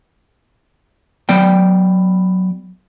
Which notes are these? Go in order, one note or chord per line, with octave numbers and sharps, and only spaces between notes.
F#3 B3 D5 G5